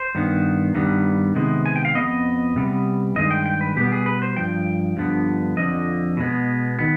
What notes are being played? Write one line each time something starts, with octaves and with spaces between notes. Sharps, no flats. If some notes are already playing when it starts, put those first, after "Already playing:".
Already playing: C5
G2 D#3 B3
G2 D#3 G3 B3
C3 D#3 G#3 B3
G#5
G5
F5
F2 D#3 B3 D#5
C3 G3 B3
G2 D#3 G#3 D#5
G5
G5
B4
B2 G3 B3 G4
G#4
B4
C5
G2 F3 G5
G2 D3 F3 B3
F2 D3 F3 D#5
B2 G#3 B3
D#3 B3